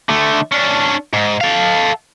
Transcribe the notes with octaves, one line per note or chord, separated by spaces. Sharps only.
D3 A3
C#4 D4
G#2
A4 F5